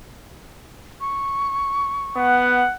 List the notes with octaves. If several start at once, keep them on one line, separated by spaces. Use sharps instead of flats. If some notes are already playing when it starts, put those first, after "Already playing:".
C#6
B3 F#5